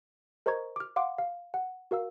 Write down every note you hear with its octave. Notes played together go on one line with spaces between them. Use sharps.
A#4 C5 D#5 A#5 C#6 G#6
D6 F6
F5 F#5 C6 D6
F5
F#5
F#4 A#4 F5 E6